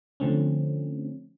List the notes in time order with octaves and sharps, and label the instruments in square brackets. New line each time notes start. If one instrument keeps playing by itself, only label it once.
[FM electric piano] D3 F3 A3 C4 C#4